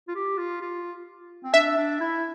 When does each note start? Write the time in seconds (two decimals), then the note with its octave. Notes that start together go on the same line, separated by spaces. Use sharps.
0.08 F4
0.15 G4
0.38 F4
0.61 F4
1.44 C4
1.54 D4 E5
1.77 D4
2.00 E4